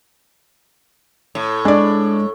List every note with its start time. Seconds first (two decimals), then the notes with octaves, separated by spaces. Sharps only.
1.35 A2
1.65 G#3 D4 D5